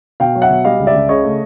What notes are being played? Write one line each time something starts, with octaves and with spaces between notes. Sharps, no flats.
B2 F5 G5
F#3
E5 F#5
B2
G3 D#5 F5
C#2
D5 E5
C#2
C#3 C#5 D#5
A3